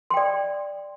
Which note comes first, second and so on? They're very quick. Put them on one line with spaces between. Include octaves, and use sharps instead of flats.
C6 G5 D5